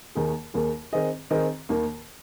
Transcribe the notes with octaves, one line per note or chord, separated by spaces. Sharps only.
D#2 D#3 A#3 G#4
D#2 D#3 A#3 G#4
D#3 C4 G#4 D#5
D#3 C4 G#4 D#5
D#2 D#3 A#3